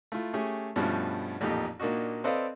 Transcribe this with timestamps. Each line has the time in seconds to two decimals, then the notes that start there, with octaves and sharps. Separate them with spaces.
0.12 A3 E4 F4
0.34 A3 C#4 G4 G#4
0.76 G2 B2 F3 G3 A3 C#4
1.41 A1 F2 A#2 D#4 G4
1.80 A#2 A#3 D4 D#4 F#4
2.24 C4 A4 B4 D5 D#5 F5